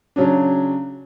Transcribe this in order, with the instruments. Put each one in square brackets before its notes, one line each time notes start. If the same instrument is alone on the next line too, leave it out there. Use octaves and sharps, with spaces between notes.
[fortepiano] C#3 F#3 C#4 D4